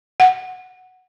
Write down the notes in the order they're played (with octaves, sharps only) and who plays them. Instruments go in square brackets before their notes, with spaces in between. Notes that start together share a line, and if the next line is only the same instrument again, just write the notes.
[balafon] F#5